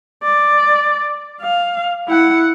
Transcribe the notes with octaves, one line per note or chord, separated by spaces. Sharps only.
D5
F5
E4 F#5